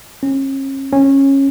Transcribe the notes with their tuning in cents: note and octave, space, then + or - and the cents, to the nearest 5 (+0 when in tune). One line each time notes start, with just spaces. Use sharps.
C#4 -40
C#4 -20